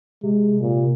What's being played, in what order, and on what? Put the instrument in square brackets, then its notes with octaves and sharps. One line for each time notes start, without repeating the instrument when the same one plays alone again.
[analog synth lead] C3 [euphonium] G#3
[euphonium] A#2